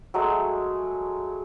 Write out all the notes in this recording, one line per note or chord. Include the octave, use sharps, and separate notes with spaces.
F#3 G#3 A3